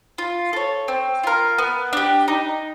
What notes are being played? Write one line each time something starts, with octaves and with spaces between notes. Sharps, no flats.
F4
A4 C#5
C4
F4 A#4
B3
D4 G4
D#4